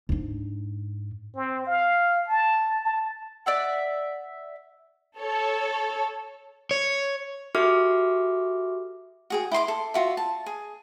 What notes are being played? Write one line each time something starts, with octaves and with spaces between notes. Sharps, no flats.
G#2 D4
C4
F5
A5
A5
D5 E5 F#5
A4 C#5
C#5
F#4 G4 A4 E5 D6 F6
F#4 G#4 G5
E4 D#5 C6 D6
A4
F4 F#4 E5
A5
G#4